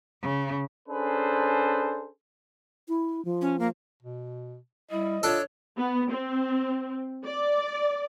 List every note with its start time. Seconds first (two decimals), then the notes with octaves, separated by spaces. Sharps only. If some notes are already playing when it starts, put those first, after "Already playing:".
0.22 C#3
0.89 C#4 D4 G#4 A4 B4 C5
2.88 E4
3.25 F3
3.41 C#4
3.59 A#3
4.03 B2
4.91 G3 E4 D#5
5.23 D4 F4 A4 C#5
5.78 B3
6.11 C4
7.25 D5